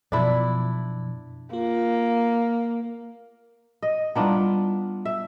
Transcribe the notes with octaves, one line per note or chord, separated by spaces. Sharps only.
F#2 B2 F3 D4 E4
A#3 F4
D#5
G3 B3 D4 E4 F4 A#5
E5